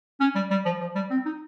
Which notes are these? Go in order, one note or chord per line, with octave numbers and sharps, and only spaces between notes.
C#4
G3
G3
F3
F3
G3
C4
D#4